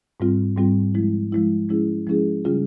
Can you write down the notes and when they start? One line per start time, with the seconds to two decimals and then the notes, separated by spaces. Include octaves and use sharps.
0.20 G#2 G3 C4 F4
0.57 G#2 G3 C4 F4
0.95 F3 G#3 E4
1.32 F3 G#3 E4
1.69 F3 G#3 C#4 E4 G#4
2.07 F3 G#3 C#4 E4 G#4
2.44 C#3 G3 C#4 F4 G#4